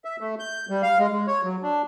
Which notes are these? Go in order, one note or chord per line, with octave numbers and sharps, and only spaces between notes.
E5
A3
G6
G3
F5
G#3
G#3
C#5
F#3
D4